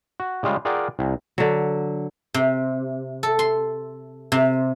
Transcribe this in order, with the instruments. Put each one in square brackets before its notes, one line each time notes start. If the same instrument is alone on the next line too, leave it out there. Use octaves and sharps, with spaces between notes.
[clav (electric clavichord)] F#4
C#3 G3 G#3 F4
F4 G#4 A#4 D5 F#5 G5
C2
[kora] D3 F#3
[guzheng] C3
A4
C6
C3